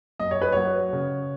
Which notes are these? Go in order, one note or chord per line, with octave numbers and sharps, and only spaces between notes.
F#2 D#5
C#5
B4
F#3 C#5
C#3